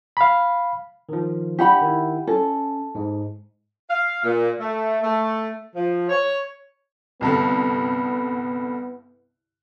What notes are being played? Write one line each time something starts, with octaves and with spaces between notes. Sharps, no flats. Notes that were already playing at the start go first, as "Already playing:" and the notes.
F5 B5
D#3 F3
D4 G4 F#5 B5
D#3 E4
C#4 A4
G#2 G#3
F5
A#2
A3
A3
F3
C#5
C2 G2 D3 B3